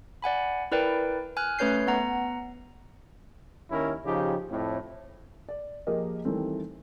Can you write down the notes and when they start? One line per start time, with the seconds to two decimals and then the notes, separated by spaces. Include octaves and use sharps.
0.22 D5 F#5 G#5 B5
0.72 E4 A#4 B4 D5 G5
1.37 G#5 F6 F#6
1.59 A3 C#4 B4 C#5 G6 C7
1.87 B3 F#5 A#5
3.71 D#2 D#3 C#4 E4 A#4
4.05 C#3 F3 D#4 G4
4.50 F2 A2
5.49 D5
5.87 F3 A#3 G4 G#4 A#4 D#5
6.25 D#3 E3 G3 A3 C4